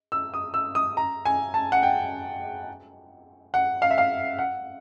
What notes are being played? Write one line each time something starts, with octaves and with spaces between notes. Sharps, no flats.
E6
D#6
E6
D#6
A#5
G#5
A5
F#5
G5
F#5
F5
E5
F5
F#5